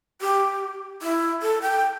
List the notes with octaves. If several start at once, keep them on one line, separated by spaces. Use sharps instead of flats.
G4
E4
A4
G5